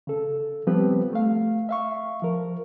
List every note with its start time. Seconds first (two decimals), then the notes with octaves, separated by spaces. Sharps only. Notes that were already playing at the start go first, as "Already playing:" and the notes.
0.07 C#3 A4
0.67 F3 G3 B3 C4 G4 B4
1.13 A3 F5
1.69 E5 F5 C#6
2.22 F3 A#4